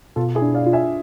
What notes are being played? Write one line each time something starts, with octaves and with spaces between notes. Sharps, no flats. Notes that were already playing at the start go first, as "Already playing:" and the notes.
B2 F4 A4
E4 G#4
D4
D5 F5
F4
E5 G#5